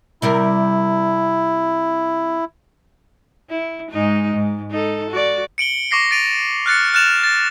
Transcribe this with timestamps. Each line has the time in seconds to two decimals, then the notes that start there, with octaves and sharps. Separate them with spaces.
0.22 C3 G3 E4 A#4
3.50 E4
3.91 G#2 G#3 D#4
4.34 G#2
4.71 D#4 A4
5.10 F#4 D5
5.58 C#7 D7 F#7 G7
5.91 C#6 D6 A#6 C7
6.11 A6 A#6 D7 D#7 F7
6.66 F6 F#6 A6 C#7
6.94 F6 F#6 A6 E7 F7
7.24 A6